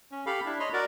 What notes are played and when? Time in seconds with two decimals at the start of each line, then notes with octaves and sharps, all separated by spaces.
0.12 C#4
0.26 G4 A4 F5 B5
0.46 D4 E4
0.60 C#5 D#5 B5 C6
0.73 F#4 A#4 D5